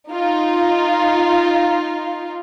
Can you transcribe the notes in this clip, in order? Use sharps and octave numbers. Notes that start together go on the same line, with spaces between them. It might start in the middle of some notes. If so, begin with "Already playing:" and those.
D#4 F4